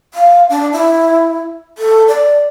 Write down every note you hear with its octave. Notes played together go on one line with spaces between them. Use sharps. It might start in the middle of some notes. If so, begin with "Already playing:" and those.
F5
D4
E4
A4
D5